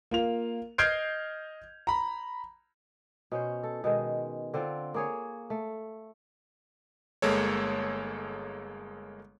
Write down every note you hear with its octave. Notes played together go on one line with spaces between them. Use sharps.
A#3 F4 F7
D#5 F6 G6 G#6 C7 D7
A#5 B5
B2 C#4 C5
A4
B2 D#3 G#3
D3 C4 F4
A#3 G#4 C#5
A3
G1 G#3 A#3 A4 C#5